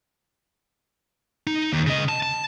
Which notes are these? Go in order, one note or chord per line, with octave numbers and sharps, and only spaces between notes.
D#4
D#2
C#3 D#5
A5
A5